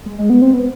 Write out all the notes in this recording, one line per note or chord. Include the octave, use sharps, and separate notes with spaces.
G#3
G#3
B3
C4
B3